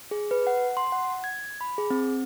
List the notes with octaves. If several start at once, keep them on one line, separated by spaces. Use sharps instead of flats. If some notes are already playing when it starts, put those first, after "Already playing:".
G#4
B4
F#5
C6
F#5
G#6
B5
G#4
C4